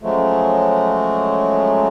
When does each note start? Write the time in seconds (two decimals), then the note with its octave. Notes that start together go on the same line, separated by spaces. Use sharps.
0.02 C#3 F3 F#3 G#3 A3